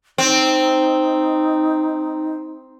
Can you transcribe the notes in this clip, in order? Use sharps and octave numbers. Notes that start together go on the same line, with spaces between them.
C4 D#4